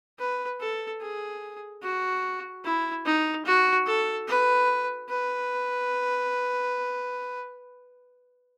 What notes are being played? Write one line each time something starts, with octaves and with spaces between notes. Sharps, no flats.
B4
A4
G#4
F#4
E4
D#4
F#4
A4
B4
B4